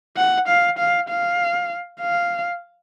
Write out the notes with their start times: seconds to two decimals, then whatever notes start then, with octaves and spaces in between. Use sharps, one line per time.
0.17 F#5
0.48 F5
0.78 F5
1.09 F5
2.01 F5